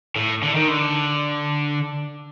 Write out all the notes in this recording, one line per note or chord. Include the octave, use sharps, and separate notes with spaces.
A2
D3
D#3
D3